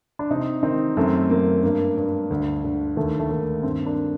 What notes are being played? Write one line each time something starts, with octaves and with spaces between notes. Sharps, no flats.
D4
C3 C4 D#4
D#3 C4 D#4
F#2 A3 C4
F#2 A#3
G2 A#3
G2
D2
D3
D#2 A3
A3
D#2 A#3
G2 A3 C4
A#3 D4